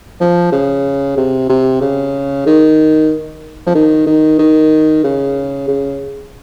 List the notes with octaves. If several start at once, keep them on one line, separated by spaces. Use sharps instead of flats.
F3
C#3
C3
C3
C#3
D#3
F3
D#3
D#3
D#3
C#3
C#3